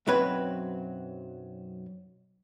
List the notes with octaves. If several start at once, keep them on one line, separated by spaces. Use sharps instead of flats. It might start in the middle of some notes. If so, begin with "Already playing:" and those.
B1 F#2 F#3 C4 B4 C#5